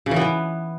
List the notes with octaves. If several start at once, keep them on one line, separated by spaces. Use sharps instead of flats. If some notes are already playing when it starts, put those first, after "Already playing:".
C#3
E3
B3
E3